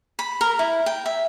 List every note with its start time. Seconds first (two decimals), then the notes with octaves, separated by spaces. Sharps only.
0.19 B5
0.41 A#4
0.59 E4
0.86 G5
1.06 E5